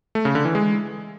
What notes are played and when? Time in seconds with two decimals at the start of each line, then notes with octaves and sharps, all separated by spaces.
0.15 A3
0.25 C#3
0.35 D3
0.45 E3
0.55 G#3